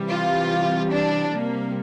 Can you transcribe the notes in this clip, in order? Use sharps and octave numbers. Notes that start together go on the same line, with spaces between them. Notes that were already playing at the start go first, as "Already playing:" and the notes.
Already playing: C3 E3 G3
F4
D4
C3 G3 A#3